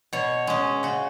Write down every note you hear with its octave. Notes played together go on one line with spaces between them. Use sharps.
B2 C#5
G#3 C#4
C#3 F#4